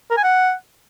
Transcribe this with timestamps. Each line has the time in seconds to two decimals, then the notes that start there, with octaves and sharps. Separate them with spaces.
0.11 A#4
0.17 G#5
0.24 F#5